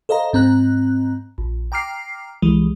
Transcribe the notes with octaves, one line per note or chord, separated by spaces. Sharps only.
A4 C5 D#5 F5 A#5
G#2 C4 A#5 F#6
A#1
G5 A#5 D6 F6 C7
C2 E3 G#3